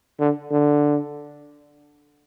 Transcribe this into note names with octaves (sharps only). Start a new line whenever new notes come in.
D3
D3